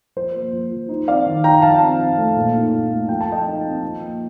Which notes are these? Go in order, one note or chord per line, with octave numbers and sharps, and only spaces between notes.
F3 C5
A#3
F3
F3
D#4
C4 D5 F5
D#3
D#4 G5 A#5
F3 F5 A5
C4
C4
A3
A#2
D#4
A#2
A3
F3 G5
A5
F3 D#5 G5
D#4
C4
F3
A#3